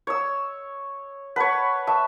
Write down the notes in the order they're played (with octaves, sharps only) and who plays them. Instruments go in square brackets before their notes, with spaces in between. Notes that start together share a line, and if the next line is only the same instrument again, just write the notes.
[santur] C#5 E6
[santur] B4 C#5 [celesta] F#5 A5
[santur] E5 [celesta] A5 C#6